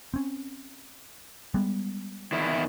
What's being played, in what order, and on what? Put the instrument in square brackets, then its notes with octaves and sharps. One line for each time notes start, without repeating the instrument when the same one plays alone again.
[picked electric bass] C4 C#4
G3 G#3 B3
[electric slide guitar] E2 D#3 E4